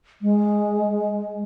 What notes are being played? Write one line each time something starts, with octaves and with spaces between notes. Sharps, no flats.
G#3